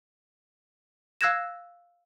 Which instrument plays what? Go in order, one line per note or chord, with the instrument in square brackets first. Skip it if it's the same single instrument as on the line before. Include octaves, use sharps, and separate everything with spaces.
[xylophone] F5 E6 F#6 G#6 A#6 E7